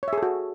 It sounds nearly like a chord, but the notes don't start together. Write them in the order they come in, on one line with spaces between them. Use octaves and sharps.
C#5 E5 G#4 A4 F#4